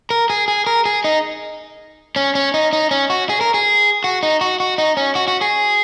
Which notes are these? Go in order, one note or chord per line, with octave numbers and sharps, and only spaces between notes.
A#4
G#4
G#4
A#4
G#4
D#4
C#4
C#4
D#4
D#4
C#4
F#4
G#4
A#4
G#4
F#4
D#4
F#4
F#4
D#4
C#4
F#4
F#4
G#4